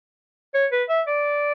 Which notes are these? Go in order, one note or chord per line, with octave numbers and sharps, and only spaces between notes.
C#5
B4
E5
D5